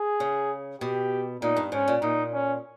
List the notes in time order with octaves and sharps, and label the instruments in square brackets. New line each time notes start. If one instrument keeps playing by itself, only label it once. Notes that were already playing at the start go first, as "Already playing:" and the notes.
Already playing: [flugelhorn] G#4
[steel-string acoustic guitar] C#3
[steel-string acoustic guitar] B2 [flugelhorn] G4
[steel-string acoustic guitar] A#2 [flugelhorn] D#4
[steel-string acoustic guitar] G2
[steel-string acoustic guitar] G#2 [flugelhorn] C#4
[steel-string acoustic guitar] A#2
[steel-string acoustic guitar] A#2 [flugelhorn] D#4
[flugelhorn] C#4